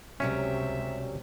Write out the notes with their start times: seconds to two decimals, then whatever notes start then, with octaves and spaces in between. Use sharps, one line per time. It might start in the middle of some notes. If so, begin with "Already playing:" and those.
0.20 C#2 F#2 C3 F#3 G3 C#4 E5